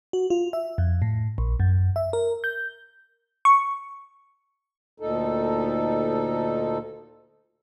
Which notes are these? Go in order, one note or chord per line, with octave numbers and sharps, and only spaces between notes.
F#4
F4
E5
F2
A2
A#1
F#2
E5
A#4
G6
C#6
D2 A#2 D#4 A4